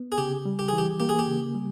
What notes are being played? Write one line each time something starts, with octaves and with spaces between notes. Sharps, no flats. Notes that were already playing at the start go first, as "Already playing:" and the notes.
Already playing: B3
G#4
C#3 G4
G3
G4
E3 G#4
G4
A#3 G4
G#4
G4
C#3
G3